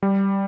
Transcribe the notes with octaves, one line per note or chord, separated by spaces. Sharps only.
G3